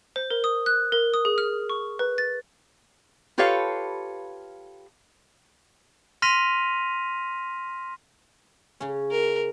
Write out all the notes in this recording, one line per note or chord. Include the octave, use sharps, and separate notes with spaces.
C5
A#4
D#6
F#6
A#4
D#6
G#4
F6
C#6
B4
A6
F4 G4 A4 B4 C#5 F5
C6 F6 A#6 B6 D#7 F7
C#3 C#4
A#4